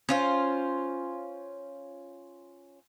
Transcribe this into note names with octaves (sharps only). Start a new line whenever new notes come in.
C#4 F4 C5